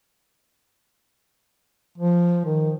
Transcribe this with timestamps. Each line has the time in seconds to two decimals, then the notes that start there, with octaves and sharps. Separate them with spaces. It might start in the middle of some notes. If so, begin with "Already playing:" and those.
1.98 F3
2.45 D#3